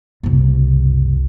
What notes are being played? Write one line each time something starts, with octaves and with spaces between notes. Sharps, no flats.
F#1 C2